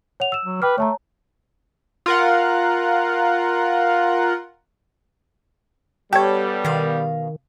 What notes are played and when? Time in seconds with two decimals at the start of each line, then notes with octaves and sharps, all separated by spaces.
0.20 C#5 F#5 F7
0.32 E6 E7
0.45 F#3
0.62 B4 G5 D6 F6
0.78 A3 C#5 A5 A#5
2.06 F4 A#4 F#5
6.13 G3 B3 G4 A4 C#5
6.65 B2 D#3 F5